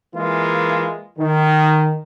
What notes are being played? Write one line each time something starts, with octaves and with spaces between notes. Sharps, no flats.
E3 G#3 A#3 F4
D#3